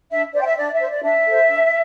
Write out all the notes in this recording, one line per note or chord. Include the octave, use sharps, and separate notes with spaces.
D4 E5
C5 D5
G5
E5
D4 D5
E5
C5
D5
D4 E5
A4 C5
D4